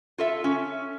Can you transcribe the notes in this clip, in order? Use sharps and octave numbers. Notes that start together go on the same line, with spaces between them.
F4 A4 E5
C#4